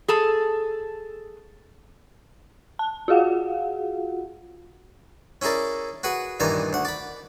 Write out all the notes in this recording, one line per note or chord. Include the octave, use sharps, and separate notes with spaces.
G#4 A4 A5
A5
F4 F#4 G#4 F5 F#5
C#4 E4 G#4 A#4 D5
F#4 G#4 B4 F#5
G2 A#2 D#3 E3 G#5 A#5
D2 F#5
D5 B5